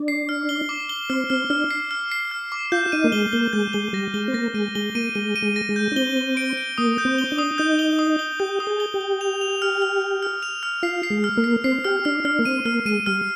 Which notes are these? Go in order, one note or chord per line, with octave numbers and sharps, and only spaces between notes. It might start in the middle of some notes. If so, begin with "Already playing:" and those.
Already playing: D4
C7
F6
G7
D6
G7
C4 F6
C4 F6
D4 F6
C7
F6
C7
F6
D6
F4 G6
D#4 D#7
A#3
G#3 G7
A#3 G7
G#3 G6
G#3 G7
G3 A#6
G#3 G7
C4
A#3 A#6
G#3 D#7
G#3 G7
A#3 D#7
G#3 D#7
D#7
G#3
A#6
G#3
G6
D4
C4 G7
G7
D7
D7
A#3 D#6
G6
C4
G7
D4
D#6
D#4 G6
G7
D#6
G7
G4 G6
D#6
G#4
G7
G4
G7
F7
F7
F6
F6
F6
F6
F7
F6
F4 C7
C7
G#3
F6
A#3
C7
C4 C7
G4 F6
D4 F6
D4 F6
A#3
C4 D#7
A#3 F6
G#3 D#7
G3 F6